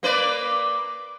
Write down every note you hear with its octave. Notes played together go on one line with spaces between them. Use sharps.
A#3 B4 D5